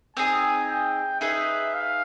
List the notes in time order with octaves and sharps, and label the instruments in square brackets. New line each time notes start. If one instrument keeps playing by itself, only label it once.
[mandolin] C4 D#4 G#4 [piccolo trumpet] G#5
[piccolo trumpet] G5
[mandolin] D#4 G#4 B4 [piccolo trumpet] E5
[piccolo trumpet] F5